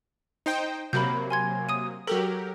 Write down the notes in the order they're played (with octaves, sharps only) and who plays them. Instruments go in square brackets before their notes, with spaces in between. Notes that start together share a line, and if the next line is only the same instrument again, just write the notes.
[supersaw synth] D#4 C5 G5
[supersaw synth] C3 F#3 A#3 [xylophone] B5 G6
[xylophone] G#5 C6 G#6
D#6 D#7
[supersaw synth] F#3 G4 A#4 [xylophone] A4